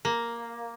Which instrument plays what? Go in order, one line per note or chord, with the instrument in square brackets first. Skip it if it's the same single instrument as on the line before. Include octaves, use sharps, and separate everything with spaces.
[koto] A#3